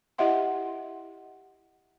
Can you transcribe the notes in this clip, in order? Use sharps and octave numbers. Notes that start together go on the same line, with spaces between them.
E4 G4 D#5 E5 F#5 C6